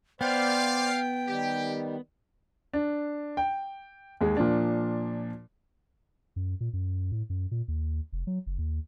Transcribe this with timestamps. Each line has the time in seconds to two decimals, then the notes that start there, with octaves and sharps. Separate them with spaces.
0.21 B3 C5 D5 F5 G5
1.27 D#3 G3 G4
2.74 D4
3.37 G5
4.21 D#2 G#3
4.37 A#2 F3 D4
6.36 F#2
6.61 A#2
6.73 F#2
7.12 A2
7.30 F#2
7.51 A#2
7.68 D#2
8.12 F1
8.27 F#3
8.47 F#1
8.58 D#2